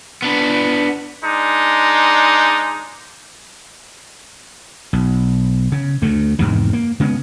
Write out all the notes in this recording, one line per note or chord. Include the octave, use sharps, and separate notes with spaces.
B3 D4
G#3 D4 D#4
B1
C#3
D2 A3
E2 G#2 C3 D#3
A#3
C#3 G#3 A#3 B3